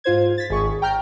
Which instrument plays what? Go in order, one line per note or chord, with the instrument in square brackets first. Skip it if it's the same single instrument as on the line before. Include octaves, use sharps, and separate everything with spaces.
[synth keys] G#2 F4 C5 G#6
A6 B6
G#1 G#4 C#6
G5 A#5 F6 G6